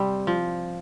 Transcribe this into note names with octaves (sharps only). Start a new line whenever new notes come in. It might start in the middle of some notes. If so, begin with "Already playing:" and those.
Already playing: C3 G3 C4 G4
F3